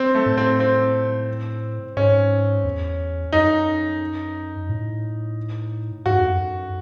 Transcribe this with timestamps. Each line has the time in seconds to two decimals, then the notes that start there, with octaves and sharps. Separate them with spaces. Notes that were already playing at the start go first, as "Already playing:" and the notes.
Already playing: C4
0.15 A3
0.26 A2
0.37 C4
0.60 C4
1.96 G#2 C#4
2.64 E2
3.33 F#2 D#4
4.69 A2
6.06 G#2 F#4
6.13 F#2
6.21 E2
6.29 F#2